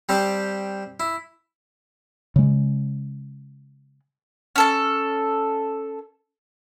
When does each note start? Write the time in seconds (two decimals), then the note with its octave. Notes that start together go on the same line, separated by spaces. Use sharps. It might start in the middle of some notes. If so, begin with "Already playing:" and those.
0.09 G3 C4 G4 A5
1.00 E4
2.36 C#3 G#3
4.56 C#4 A4 A5